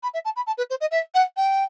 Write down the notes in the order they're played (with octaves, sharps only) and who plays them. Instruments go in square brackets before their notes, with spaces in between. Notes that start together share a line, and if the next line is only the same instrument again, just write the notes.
[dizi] B5
E5
A5
B5
A5
B4
C5
D#5
E5
F#5
G5